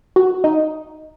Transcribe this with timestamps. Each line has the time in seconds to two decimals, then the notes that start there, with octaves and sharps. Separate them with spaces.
0.16 F#4
0.44 D#4